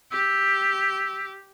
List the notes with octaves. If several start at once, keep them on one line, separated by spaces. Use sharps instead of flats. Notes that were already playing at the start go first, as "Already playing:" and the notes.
G4 E6